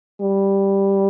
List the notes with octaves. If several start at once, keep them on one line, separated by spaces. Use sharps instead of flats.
G3